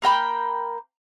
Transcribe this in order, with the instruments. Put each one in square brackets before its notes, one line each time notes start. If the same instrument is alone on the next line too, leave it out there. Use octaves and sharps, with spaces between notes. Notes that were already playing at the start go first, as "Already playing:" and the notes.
[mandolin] A#3 A#4 G5 B5